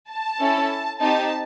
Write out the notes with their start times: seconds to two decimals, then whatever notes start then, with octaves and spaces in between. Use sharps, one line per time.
0.10 A5
0.39 C#4 E4 A4
0.99 C4 D#4 G4 A5